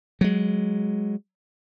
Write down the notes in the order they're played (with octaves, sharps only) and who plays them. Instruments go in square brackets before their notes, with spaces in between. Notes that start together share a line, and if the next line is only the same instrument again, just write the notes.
[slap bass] F#3 G#3